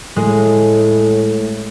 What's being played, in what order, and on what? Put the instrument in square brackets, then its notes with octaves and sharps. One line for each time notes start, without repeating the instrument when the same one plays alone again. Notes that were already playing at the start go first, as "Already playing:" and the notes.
[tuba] A2 [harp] G#3